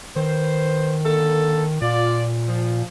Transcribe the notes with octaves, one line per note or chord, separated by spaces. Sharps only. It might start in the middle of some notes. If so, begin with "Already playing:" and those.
D#3 B4 C5
D3 A#3 A4
A#2 F4 D5
F3